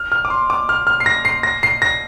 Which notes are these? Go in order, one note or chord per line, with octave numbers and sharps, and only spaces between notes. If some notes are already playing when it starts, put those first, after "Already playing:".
Already playing: F6
F6
D6
C6
D6
F6
F6
C7
A#6
C7
A#6
C7
A#6